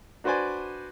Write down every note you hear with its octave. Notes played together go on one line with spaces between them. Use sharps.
D4 F#4 B4 C5 D5 G#5